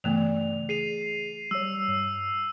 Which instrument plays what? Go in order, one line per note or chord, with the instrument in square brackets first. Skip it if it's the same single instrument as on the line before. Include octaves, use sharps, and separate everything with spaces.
[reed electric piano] G2 C#3 D5 [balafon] E3 A3 B3 [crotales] F7
[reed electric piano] G#4 [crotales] C7 D#7 F7
[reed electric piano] G3 C#5 [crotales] E6
[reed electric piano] G2